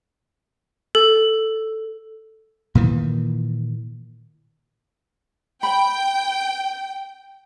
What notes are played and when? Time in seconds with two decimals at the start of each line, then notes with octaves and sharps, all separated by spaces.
0.95 A4
2.75 A#2 D#3 E3
5.63 G5 B5